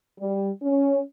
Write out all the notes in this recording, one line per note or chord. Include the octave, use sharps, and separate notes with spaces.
G3
C#4